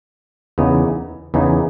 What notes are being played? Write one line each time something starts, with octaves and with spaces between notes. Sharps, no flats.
E2 C#3 E3 B3 D#4
E2 C#3 E3 B3 D#4